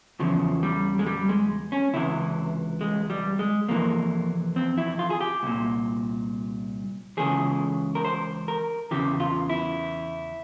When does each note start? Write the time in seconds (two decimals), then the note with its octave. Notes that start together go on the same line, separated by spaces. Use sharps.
0.19 E2 C#3 E3 F3
0.63 G3
0.99 G#3
1.06 G3
1.29 G#3
1.72 C#4
1.93 C#2 C3 E3 E4
2.81 G#3
3.10 G3
3.39 G#3
3.68 F2 C3 E3 A#3
4.56 C4
4.78 E4
4.99 F4
5.10 G#4
5.21 G4
5.43 C2 A#2
7.17 C#2 C#3 E3 G#4
7.95 A#4
8.05 C5
8.48 A#4
8.91 E2 C#3 E3 G4
9.20 F4
9.50 E4